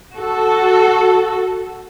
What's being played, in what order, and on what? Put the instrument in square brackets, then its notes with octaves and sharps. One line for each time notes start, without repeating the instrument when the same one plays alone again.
[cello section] F#4 A4